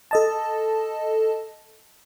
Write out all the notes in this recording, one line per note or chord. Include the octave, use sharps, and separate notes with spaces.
A4 D#5 A5